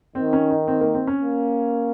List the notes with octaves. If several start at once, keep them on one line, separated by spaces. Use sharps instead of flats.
D#3 C4
C#4
D#4
C4
A#3
C4
C#4
A#3